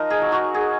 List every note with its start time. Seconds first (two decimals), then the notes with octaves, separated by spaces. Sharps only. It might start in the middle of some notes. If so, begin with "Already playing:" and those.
Already playing: F3 D#4 A#4
0.10 G#4
0.22 F#3
0.32 F#4
0.54 F#3 G#4